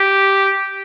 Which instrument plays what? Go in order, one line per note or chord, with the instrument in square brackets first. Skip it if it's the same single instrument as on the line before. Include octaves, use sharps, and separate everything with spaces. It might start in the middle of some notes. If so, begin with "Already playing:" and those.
Already playing: [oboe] G4